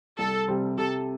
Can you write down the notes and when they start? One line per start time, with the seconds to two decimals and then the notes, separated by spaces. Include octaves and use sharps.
0.19 C2 A4
0.48 C3 G3 C4
0.78 C3 A4